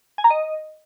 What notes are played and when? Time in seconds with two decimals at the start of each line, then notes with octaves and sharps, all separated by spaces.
0.18 G#5
0.24 A#5
0.30 D#5